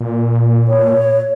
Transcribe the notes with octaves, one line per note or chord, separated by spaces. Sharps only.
A#2
C#5